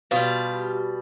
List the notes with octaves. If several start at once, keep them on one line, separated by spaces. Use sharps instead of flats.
B2 G3 F4